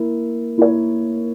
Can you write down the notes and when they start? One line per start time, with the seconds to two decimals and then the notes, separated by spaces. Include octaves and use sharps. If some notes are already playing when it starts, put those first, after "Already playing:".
Already playing: A#3 E4 A#4
0.58 A#3 E4 A#4 C#5